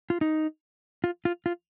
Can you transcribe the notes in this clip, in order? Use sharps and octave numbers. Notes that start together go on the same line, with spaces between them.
F4
D#4
F4
F4
F4